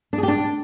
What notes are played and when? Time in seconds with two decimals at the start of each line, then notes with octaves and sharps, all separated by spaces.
0.13 D4
0.18 G#4
0.23 G4
0.28 D4